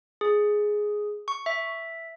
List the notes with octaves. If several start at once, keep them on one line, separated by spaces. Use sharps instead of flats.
G#4
C#6
E5